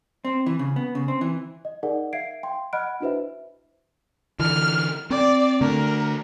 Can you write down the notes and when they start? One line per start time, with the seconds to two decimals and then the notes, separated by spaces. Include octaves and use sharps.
0.25 C4
0.46 E3
0.59 C#3
0.76 B3
0.95 C#3
1.08 C4
1.21 E3
1.65 D#5
1.83 D#4 G#4 A#4 D5 F#5
2.13 E5 F5 G#6 C7 D7
2.43 G5 C6
2.73 D#5 F#5 B5 F6 F#6 D7
3.00 D4 E4 F#4 B4 C5 E5
4.39 D3 E3 F6
5.10 C4 D5
5.61 D3 A3 A#4